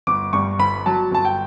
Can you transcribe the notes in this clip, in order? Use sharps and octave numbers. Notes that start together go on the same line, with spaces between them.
G1 D6
G2 C#6
G1 B5
F#3 A5
G1 A5
G5